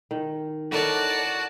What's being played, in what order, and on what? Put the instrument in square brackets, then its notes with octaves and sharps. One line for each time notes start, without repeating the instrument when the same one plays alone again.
[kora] D#3
[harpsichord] D3 C#4 D#4 [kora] E4 A#4 [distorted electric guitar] F#4 [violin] D5 A5